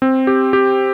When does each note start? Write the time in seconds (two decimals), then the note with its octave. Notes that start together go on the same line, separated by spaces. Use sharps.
0.02 C4
0.27 G4
0.53 G4